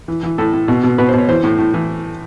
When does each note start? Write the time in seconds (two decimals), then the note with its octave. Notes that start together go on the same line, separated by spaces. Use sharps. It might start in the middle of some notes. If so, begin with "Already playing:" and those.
0.08 E3
0.23 E3
0.38 A2 A4
0.53 A2
0.68 B2
0.83 B2
0.98 B2 B4
1.09 C5
1.14 B2 C#5
1.28 E3 C5
1.44 A2
1.58 A2
1.74 E3